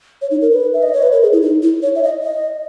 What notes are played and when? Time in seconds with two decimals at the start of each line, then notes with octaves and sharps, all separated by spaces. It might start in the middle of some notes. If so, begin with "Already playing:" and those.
0.22 C#5
0.31 D#4
0.42 A#4
0.52 B4
0.74 E5
0.83 D#5
0.93 C#5
1.02 B4
1.12 A#4
1.22 G#4
1.33 E4
1.42 D#4
1.62 E4
1.83 C#5
1.95 E5
2.03 D#5
2.23 D#5